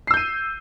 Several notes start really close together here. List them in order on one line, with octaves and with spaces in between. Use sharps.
C7 E6 G6 D#7